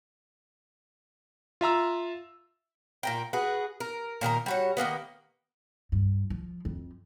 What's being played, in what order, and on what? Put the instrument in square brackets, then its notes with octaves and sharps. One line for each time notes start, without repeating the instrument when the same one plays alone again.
[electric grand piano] F4 E5 A#5 E6
[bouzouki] A#2 A#4 G5
F#4 G#4 B4
A#4
A#2 D#3 A#4 A#5
G3 F#4 C#5
D#3 G#3 A#3 B3
[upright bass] G2
F3
F2